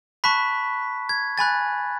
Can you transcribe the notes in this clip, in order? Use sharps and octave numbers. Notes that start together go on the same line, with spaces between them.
A5 B5 C#6 F#6 B6
G#6
G#5 B5 F#6 A6